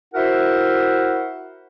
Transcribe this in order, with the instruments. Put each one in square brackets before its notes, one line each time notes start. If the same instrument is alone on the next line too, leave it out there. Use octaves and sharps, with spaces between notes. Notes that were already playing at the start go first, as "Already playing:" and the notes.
[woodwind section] E4 F#4 A#4 C5 E5 F#5